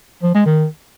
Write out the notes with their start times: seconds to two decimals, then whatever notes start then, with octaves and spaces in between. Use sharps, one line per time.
0.23 F3
0.34 G#3
0.46 D#3